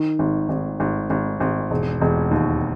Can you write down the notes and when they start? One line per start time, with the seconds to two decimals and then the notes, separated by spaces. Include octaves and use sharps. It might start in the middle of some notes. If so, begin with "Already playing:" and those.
Already playing: D#3
0.19 G#1
0.49 G#1
0.80 G#1
1.10 G#1
1.40 G#1
1.71 E1
2.01 E1
2.31 D#2